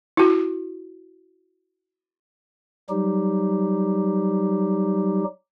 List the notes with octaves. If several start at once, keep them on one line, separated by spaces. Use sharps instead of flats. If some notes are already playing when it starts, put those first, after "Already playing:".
E4 F#4
F#3 G3 D#4 G4